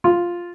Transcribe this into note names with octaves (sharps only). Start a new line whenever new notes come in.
F4